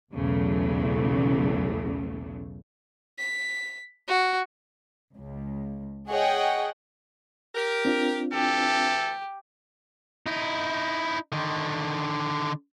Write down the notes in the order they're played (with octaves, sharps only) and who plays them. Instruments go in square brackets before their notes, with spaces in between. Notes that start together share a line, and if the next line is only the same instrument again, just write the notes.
[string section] B1 E2 C#3 F#3 A3
[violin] B6
F#4
[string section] C#2
G#4 C#5 D#5 F#5 G5
[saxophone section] G4 A#4
[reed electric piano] C4 D4 F4
[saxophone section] D2 E3 [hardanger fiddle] G4 [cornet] A4
[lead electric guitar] D#4 E4
D3 D#3